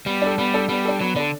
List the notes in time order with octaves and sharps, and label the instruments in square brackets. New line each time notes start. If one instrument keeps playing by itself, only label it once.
[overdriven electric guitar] G3 [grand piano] B3
[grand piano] D4 A4
[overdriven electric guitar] G3 [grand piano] B3
[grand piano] D4 A4
[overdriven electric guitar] G3 [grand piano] B3
[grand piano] D4 A4
[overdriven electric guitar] F#3 [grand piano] B3
[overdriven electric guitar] D3 [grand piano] D4 A4